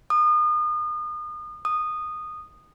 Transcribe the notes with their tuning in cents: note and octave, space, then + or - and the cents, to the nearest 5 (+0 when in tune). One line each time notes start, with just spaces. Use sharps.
D#6 -35
D#6 -15